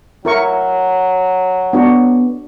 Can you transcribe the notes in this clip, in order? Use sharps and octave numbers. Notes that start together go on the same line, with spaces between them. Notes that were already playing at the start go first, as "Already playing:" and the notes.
F#3 E4 A#4 C#6
B3 D4 F#4